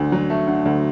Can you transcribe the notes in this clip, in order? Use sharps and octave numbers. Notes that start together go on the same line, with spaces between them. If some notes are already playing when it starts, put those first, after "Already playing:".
Already playing: D2 D3
F#3
A3
D3
D2